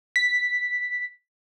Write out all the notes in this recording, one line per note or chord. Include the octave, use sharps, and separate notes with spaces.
B6